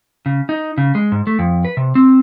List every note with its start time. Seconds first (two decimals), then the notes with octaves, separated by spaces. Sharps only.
0.26 C#3
0.49 D#4
0.78 C#3
0.95 G#3
1.12 G#2
1.27 A3
1.39 F2
1.65 B4
1.77 C3
1.95 C4